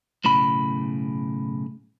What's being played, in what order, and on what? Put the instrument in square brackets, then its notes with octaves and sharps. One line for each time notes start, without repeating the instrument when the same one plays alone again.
[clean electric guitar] B1 A2 C#3 B5